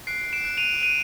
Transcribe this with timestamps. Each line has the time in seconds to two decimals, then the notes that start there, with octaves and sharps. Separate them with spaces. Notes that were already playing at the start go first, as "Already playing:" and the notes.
0.07 F#6 C7 D7
0.33 D7 E7
0.45 F#6
0.57 D#7 F7
0.83 F#6 D#7 F7